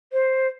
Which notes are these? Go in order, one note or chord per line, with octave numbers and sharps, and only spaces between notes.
C5